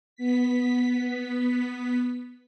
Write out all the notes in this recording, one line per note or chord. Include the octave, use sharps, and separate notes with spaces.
B3 B6